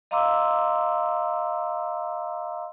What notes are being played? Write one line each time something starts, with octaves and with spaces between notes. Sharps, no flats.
D#5 F5 A#5 C6 D6 E6